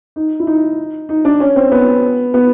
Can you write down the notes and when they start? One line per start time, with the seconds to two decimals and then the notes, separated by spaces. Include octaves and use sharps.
0.16 D#4
0.40 E4
0.47 D#4
1.09 D#4
1.25 D4
1.40 C#4
1.56 C4
1.72 B3
2.34 B3